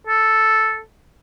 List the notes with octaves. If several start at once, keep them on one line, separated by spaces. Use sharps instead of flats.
A4